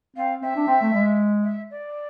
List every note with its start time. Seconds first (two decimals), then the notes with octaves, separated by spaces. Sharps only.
0.16 C4 F5
0.42 C4 E5
0.55 D4
0.68 C4
0.81 A3
0.93 G#3
1.44 E5
1.71 D5